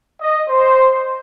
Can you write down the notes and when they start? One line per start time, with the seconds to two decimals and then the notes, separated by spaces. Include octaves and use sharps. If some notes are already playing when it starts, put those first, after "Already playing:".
0.20 D#5
0.49 C5